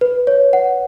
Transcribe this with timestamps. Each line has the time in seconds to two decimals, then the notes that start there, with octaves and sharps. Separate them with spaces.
0.01 B4
0.27 C#5
0.53 F#5